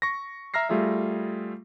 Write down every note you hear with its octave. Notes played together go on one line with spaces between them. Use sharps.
C#6 A#6
E5 A#5 F6 A#6 C7
G3 A3 F4 G#4 E5